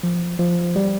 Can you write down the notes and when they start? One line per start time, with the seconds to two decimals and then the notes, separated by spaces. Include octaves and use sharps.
0.03 F3
0.39 F3
0.76 G3